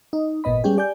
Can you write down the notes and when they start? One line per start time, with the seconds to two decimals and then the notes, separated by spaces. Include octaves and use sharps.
0.13 D#4
0.44 G#1 A#2 B3 D#5 B5
0.64 G3 G#3 B3 C#4 G4 G#4
0.77 G4 D5 G#5 G6